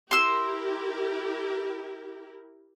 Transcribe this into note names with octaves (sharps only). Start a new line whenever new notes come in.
E4 G4 A#4 C6 E6